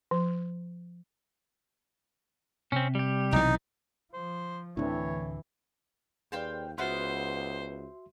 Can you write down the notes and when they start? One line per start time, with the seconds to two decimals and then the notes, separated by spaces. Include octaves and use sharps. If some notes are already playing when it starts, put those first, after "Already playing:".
0.11 F3
2.72 C3 C4 C#4
2.95 G3 G4
3.32 B1 E3 D#4
4.13 F3 C5
4.77 D2 A2 D3 E3 C4 D4 E4 C#5
6.32 D#2 G#4 B4 C5 D5 F5 G5
6.78 C#2 B3 F#4 B4 C5 E5 F5 C6